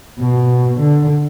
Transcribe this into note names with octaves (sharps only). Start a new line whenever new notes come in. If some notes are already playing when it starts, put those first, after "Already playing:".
B2
D3